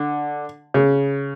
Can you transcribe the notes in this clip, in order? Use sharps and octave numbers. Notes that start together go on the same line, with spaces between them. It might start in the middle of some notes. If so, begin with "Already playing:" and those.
Already playing: D3
C#3